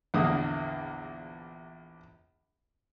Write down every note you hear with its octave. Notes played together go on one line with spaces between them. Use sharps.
A#1 E2 D3 A#3 D#6